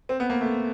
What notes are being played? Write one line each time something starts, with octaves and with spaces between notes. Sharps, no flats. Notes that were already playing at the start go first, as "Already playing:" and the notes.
C4
B3
A#3
A3